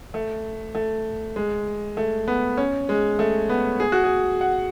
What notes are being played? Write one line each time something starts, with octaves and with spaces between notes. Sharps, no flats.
A3
A3
G#3
A3
B3
C#4
G#3
A3
B3
G#4
F#4
G#4
F#5